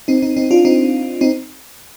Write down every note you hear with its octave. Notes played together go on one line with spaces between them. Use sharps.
C4 D#4
C4 D#4
C4 D#4
D4 F4
C4 D#4
C4 D#4